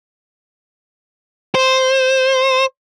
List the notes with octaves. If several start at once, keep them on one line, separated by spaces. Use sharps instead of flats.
C5